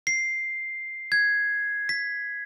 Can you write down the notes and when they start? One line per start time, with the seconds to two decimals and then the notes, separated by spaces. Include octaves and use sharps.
0.07 C7
1.12 G#6
1.89 B6